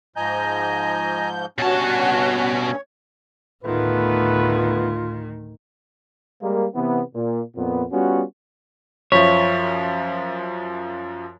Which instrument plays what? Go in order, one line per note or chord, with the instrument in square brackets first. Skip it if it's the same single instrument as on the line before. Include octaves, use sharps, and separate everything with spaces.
[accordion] G#2 F3 G6 [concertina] D#5 G#5 A#5
[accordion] G2 C#4 [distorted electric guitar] B2 A5 [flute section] F#4 [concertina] C#5
[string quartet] D2 D#3 [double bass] A2 [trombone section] A3 B3 B4 [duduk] F4
[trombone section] G3 G#3 A#3
C3 E3 B3
A#2
F2 A#2 B3
G3 B3 C#4 F4 F#4
[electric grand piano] F#2 F3 [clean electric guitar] C#5 [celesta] E5 F5 B6